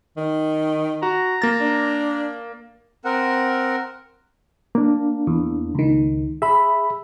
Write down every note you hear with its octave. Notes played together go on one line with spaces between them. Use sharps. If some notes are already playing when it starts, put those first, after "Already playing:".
D#3
F#4 A#5
A#3 A6
D4
C4 A#4 F#5
A#3 D4
E2
C#2 D#3
G#4 E5 B5